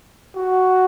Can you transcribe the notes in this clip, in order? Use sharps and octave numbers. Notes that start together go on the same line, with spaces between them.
F#4